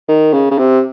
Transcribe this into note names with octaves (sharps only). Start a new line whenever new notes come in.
D#3
C#3
C#3
C3